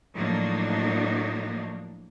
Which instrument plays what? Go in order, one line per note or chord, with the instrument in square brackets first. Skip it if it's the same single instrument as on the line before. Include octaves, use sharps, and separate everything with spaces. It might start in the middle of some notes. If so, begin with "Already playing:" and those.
[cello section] A2 F3 F#3 A#3 D4 D#4